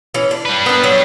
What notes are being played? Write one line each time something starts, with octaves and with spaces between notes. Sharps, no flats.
E3 C#4
D4
G3 B4
B3 D4 A#4
F#3